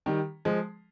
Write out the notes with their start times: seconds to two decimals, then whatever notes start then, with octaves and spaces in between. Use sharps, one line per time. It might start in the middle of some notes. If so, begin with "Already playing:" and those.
0.06 D#3 G3
0.45 F3 G#3